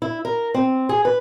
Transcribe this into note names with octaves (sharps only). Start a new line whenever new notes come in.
E4
A#4
C4
G#4
B4